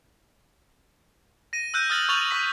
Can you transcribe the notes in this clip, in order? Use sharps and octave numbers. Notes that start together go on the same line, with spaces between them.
A#6 D#7
E6 F#6 G6 D#7
D#6 F6 A6 A#6 F#7
C#6 F6 G6 A6 F7 F#7
C#6 B6